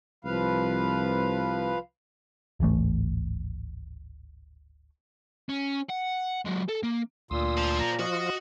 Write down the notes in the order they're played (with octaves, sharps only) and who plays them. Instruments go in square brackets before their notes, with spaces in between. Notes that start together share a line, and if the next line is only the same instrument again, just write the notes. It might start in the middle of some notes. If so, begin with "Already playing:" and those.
[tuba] C2 [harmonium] F3 B4 F5
[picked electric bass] D1 G#1 E3 A3
[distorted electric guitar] C#4
F#5
F#3 G#3
A4
A#3
[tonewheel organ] D2 D#6 E6 [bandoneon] A#2 [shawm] C6
[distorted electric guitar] C5 A5
[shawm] A#5
[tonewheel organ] F3 F4 [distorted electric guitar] F#4 [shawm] D#5